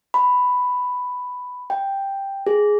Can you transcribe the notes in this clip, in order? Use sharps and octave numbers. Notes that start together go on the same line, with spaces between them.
B5
G5
G#4